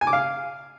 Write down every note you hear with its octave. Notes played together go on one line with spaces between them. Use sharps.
G#5
D6
F5